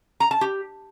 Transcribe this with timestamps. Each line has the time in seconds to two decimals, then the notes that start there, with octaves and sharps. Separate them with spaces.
0.20 A#5
0.31 A5
0.41 G4